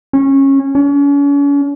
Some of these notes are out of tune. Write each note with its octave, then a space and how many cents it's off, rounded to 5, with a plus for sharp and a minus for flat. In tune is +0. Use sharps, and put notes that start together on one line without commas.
C#4 -20
C#4 +40